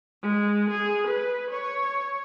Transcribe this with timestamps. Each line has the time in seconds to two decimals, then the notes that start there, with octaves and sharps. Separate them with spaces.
0.23 G#3
0.71 G#4
1.08 B4
1.51 C#5